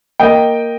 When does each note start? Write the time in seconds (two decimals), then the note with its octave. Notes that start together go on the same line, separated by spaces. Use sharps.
0.20 A#3 D#5 G5